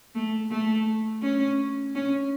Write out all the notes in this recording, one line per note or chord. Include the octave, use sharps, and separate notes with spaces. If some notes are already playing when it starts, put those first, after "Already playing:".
A3
A3
C#4
C#4